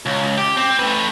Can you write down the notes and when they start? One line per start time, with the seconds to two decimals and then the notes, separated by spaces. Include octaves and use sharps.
0.06 C#2
0.38 G4
0.57 C4
0.79 A3 B4